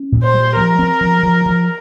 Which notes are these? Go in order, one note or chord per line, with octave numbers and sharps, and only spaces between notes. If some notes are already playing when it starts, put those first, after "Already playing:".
Already playing: C#4
A#2
C5
G3
F3 A#4
C4
F3
F3
F3